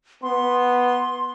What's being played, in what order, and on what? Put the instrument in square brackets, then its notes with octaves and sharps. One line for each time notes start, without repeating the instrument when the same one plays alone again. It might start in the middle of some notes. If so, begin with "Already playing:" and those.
[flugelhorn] B3 [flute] C6